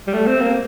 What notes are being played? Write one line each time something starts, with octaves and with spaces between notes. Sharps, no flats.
G3
A3
C4
A#3